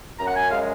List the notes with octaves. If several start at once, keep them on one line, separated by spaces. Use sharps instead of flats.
F#2 A#5
F#5
G#5
G#3 F5